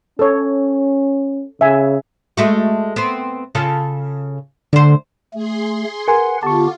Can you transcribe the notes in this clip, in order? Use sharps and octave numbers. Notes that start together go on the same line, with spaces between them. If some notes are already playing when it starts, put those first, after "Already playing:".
C#4 A4 C#5
C#3 E5 G#5
G#3 A3 F#4
B3 C4
C#3 F4 A4
D2 D3 C5
A3 G#4 C6
A#4 B4 F#5 G#5 C6
D3 B3 F4 G4 A5 C#6